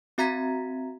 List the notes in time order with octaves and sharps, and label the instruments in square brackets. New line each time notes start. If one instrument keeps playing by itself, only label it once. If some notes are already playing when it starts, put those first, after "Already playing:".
[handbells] C4 F#4 E5 A#5 G#6 B6